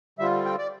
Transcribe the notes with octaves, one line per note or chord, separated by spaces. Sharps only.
D3 G3 C4 F4 E5
G5
D5